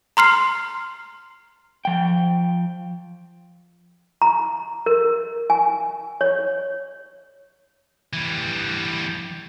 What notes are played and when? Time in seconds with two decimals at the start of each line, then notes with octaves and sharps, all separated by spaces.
0.17 A#5 C6 F6 C7
1.85 F3 G5
4.22 A#5
4.86 A#4
5.50 G#5
6.21 C#5
8.13 E3 G3